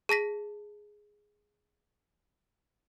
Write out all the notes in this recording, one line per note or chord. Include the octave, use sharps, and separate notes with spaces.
G#4 A5 A#6 B6